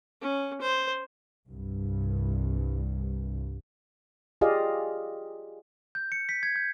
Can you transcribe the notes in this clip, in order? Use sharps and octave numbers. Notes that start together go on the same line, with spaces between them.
C#4
C5
C2 G2
F4 G4 G#4 D5 D#5 F5
G6
C#7
B6
G#6
G6